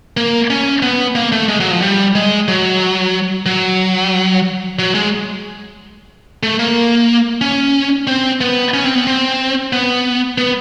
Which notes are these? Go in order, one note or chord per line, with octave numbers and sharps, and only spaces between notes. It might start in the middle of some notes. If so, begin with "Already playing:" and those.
A#3
C#4
B3
A#3
A3
G#3
F#3
F3
G3
G#3
F#3
F#3
F#3
G#3
A3
A#3
C#4
C4
B3
C#4
C4
B3
C4
B3
B3